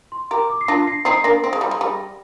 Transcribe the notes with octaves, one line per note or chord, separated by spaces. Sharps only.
C6
G4 A#4 D6
D6
C7
D4 F4 A#6
C7
C4 D#4 C7
A#3 D4 A#6
C4
G#3
G3
G#3
G3